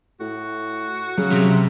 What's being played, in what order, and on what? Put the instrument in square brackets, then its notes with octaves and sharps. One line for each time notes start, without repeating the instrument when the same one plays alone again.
[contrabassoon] A2 [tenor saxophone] F#4
[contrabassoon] C#3 [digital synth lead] F#3
[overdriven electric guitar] C3